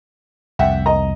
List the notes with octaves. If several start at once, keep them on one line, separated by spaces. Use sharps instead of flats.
C2 F2 E5 F#5 G5
D#5 A#5